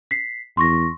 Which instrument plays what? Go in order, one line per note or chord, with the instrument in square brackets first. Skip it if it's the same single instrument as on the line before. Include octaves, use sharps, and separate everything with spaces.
[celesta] B6 C7
[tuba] E2 [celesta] C6 C#6 A#6